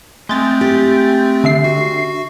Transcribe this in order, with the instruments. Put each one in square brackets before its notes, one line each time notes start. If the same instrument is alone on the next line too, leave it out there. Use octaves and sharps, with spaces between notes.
[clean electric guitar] G#3 [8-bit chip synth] A3 C4 [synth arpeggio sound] G6 A6
[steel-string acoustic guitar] G4
[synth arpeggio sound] D3 E5 C7
[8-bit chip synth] F#4